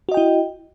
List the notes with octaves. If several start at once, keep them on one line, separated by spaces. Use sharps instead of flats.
E4 F#4 D#5 G5